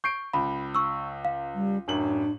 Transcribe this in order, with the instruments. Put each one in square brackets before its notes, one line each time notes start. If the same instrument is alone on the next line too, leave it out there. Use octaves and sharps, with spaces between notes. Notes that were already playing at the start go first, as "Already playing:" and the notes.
[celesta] C#6 [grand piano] G6 C7 D7
[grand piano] C#2 [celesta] B5
[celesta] C#6 E6
F5
[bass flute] G3
[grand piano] A1 F#2 F#7 [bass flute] D4